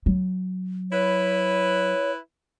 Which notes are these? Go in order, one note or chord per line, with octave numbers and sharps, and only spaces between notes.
F#3
E4 B4 C#5